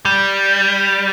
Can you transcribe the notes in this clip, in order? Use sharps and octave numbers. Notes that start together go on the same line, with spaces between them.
G3